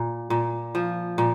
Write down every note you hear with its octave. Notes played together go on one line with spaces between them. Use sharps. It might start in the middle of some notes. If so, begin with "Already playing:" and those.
Already playing: A#2
A#2
F3
A#2